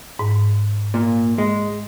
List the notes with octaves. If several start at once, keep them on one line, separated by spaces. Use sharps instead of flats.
G#2
A#2
G#3